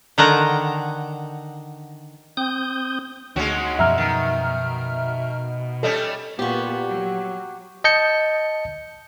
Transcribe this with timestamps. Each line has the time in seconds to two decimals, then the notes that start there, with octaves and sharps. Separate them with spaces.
0.18 D3 D#3 F#5 A#5
2.37 C4 D#6 G6
3.36 D2 D3 G#3 C#4 D#4 F#4 C#5
3.79 F#2 B2 F3 E5 A#5 F6
3.98 D#3
5.83 G3 A3 C#4 A4 D#5
6.39 A#2 B3 F#4 G4
6.88 F#3
7.84 D#5 A5 G6 C#7